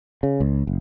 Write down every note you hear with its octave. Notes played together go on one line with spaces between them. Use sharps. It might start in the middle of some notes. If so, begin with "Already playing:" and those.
C#3
C#2
F#1